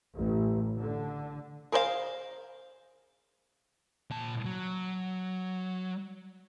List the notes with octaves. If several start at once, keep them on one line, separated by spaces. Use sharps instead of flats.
A1
D3
G#4 A#4 C5 D5 F5
A#2 A5
F#3